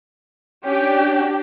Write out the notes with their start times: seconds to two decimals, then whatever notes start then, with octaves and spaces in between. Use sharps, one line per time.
0.65 C#4 D4 G4